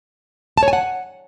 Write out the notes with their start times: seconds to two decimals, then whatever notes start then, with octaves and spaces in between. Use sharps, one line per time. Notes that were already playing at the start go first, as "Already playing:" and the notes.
0.58 A5
0.63 C#5
0.68 G#5
0.73 F#5